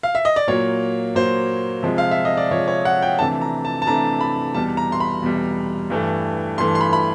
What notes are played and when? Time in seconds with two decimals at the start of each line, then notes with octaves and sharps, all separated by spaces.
0.03 F5
0.15 E5
0.25 D#5
0.36 D5
0.47 A#2 F#3 A#3 C#5
1.15 A#2 F#3 A#3 C5
1.83 C3 F3 G#3
1.98 F5
2.11 E5
2.25 D#5
2.37 D5
2.51 C3 F3 G#3 C#5
2.68 C#5
2.85 F#5
3.02 G5
3.19 C3 E3 A3 D4 A5
3.41 A#5
3.65 A5
3.82 A5
3.87 C3 E3 A3 D4 A#5
4.21 B5
4.54 E2 B2 G3 A5
4.77 A#5
4.92 C6
5.00 B5
5.22 E2 B2 G3
5.90 G2 E3 A3
6.58 G2 E3 A3 C6
6.75 C6
6.81 B5
6.93 B5